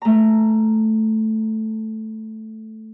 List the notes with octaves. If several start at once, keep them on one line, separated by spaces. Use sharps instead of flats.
A3 A#5